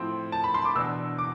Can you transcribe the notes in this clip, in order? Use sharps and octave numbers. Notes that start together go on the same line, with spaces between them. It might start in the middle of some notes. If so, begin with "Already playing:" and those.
Already playing: A2 F3 C4
A5
B5
C6
D6
E2 B2 B3 D4 E6
D6